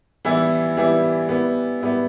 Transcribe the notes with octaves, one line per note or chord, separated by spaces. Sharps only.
E3 G3 B3 E4
E3 G3 B3 E4
G3 B3 E4
G3 B3 E4